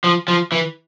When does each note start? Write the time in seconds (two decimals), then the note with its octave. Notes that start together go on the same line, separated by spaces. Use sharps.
0.04 F3
0.28 F3
0.52 E3